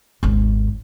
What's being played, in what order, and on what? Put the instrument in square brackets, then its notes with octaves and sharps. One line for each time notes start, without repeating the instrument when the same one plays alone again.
[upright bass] G#1 D#2